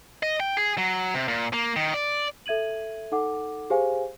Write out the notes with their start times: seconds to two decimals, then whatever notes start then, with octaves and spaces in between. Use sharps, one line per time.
0.23 D#5
0.40 G5
0.57 G#4
0.78 F#3
1.14 C3
1.28 A#2
1.53 A#3
1.76 D#3
1.94 D5
2.46 A4 E5 G#6 D#7 F#7
3.12 D#4 A4 F#5 D6
3.70 G4 G#4 C5 F5 G#5